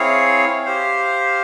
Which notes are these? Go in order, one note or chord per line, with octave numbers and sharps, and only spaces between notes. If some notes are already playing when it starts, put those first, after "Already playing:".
Already playing: C4 E4 G#4 C#5 F5
G4 C5 F5